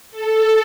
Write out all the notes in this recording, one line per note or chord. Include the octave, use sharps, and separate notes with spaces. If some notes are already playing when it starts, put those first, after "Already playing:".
A4